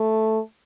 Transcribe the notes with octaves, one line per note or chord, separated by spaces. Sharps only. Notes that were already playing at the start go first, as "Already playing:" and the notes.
Already playing: A3